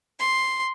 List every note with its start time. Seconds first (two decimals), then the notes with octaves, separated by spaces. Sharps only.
0.19 C6